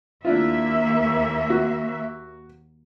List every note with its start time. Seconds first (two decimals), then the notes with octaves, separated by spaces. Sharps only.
0.25 D#2 A#3 D4 E4 F4 E5
1.50 F#4